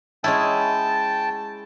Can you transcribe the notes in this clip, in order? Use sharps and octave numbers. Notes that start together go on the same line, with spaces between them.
G#3 C#4 E4 G5 A5